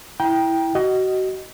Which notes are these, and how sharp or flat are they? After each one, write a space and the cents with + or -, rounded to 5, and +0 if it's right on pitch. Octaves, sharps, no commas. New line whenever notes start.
E4 +0 G5 +0 A#5 +40
F#4 +30 D#5 +0